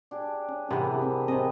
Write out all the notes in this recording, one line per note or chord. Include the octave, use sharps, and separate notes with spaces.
D4 G4 G#4
C#4
C3 E3 B3 G#4 A#4
C4
C3 C4 D#5